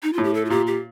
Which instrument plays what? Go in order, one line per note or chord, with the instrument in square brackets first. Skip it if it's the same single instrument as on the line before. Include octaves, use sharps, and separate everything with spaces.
[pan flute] D#4
[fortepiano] A2 [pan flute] F4
[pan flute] G4
A4
F4
[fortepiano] A#2 [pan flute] G4
[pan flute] G4